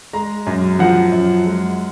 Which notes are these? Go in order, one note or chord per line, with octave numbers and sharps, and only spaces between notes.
G#3 A#5
F#2
F3 F#5
F#2
G#3